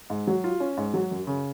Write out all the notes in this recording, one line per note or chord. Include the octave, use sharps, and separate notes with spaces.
G#2
F#3
F4
C#4
G#2
F#3
F#2
C#3